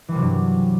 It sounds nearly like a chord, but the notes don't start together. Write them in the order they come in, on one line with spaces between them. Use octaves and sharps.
E3 G3 C3 F#3 G2